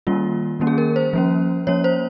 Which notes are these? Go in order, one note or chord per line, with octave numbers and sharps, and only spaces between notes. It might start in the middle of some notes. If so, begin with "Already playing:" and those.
D#3 G3 A#3 C#4 F4
D#3 G3 A#3 C#4
G#4
A#4
C5
F3 A#3 C#4
F3 A#3 C#4 C#5
C5